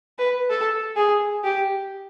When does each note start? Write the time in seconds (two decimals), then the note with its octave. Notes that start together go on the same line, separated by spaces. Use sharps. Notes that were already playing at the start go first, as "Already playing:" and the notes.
0.18 B4
0.50 A4
0.96 G#4
1.44 G4